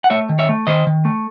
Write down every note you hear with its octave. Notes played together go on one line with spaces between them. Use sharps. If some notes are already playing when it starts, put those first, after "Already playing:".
F#5
A3 C#5 E5
D#3
C#5 E5
A3
D#3 C5 D#5
D#3
A3